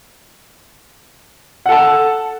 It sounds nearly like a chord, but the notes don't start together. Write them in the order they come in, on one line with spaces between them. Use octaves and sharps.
F#5 A4 A5